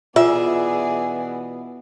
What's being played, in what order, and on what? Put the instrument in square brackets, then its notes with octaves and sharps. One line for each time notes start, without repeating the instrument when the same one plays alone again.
[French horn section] B2 E3 B3 [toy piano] F4 [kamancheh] G#4 D5 [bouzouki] E5